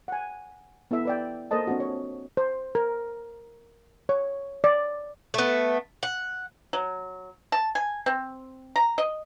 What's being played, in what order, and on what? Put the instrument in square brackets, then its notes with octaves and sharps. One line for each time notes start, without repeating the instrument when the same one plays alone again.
[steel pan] F#5 G#5
B3 E4 A4 E5
B4 D5 G5
A#3 A4 A#4 C5 D#5 A5
C4 D4 F#4
C#5
C5
A#4
C#5
D5
[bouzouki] A3 B3
F#5
[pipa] F#3
A5
G#5
C4
A#5
D#5